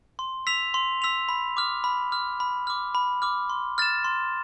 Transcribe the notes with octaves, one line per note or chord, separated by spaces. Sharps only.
C6
E6 B6 F7
C6
E6 B6 F7
B5
D6 F6
B5
D6 F6
B5
D6 F6
B5
D6 F6
C6
F6 A6 E7
C6